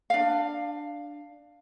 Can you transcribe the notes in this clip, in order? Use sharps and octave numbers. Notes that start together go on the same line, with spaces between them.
D4 F5